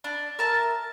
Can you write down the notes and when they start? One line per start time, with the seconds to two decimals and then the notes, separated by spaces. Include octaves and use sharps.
0.04 D4
0.39 A#4 E5 A5